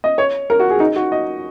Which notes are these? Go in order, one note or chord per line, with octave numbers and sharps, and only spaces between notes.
D#5
C#5
A#4
F#4
G#4
D#4
F#4
D#5